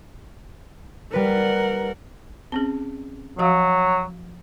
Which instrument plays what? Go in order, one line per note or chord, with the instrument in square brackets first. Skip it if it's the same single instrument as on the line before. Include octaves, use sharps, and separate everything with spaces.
[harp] G3 B4 [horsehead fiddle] A#4 F#5
[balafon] C4 C#4 G#4
[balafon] F3 F#4 F5 [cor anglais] F#3